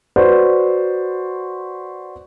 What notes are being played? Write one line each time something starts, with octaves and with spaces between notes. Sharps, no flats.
F#4 B4 C5 D5